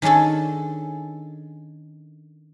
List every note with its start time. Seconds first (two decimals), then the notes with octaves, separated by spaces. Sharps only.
0.02 D#3 C#4 D4 G#4 A4